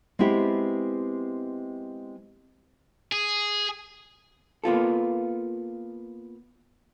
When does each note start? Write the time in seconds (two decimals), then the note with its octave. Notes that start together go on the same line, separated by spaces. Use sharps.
0.19 G#3 B3 C4 E4 G4
3.12 G#4
4.64 A#3 B3 F4 A4